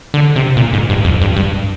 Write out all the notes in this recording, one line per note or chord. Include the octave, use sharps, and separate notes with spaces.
D3
C3
A#2
G#2
G2
F2
G2
G2